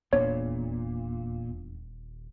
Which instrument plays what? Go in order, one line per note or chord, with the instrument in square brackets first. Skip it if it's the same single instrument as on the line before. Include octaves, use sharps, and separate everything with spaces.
[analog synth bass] D#1 [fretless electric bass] E2 B3 D4 [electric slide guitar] A#2 [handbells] C#5